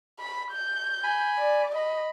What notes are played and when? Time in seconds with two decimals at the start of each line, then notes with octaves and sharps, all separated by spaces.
0.19 B5
0.51 G6
1.04 G#5 B5
1.39 D5
1.75 D#5 B5